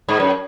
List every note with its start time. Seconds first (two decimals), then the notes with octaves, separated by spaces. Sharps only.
0.09 G#2
0.20 F#2